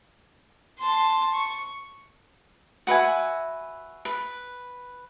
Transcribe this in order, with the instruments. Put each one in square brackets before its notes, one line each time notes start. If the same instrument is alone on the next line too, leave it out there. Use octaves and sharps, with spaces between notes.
[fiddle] A5 C6
C#6
[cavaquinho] F#4 B4 E5 G#5
B4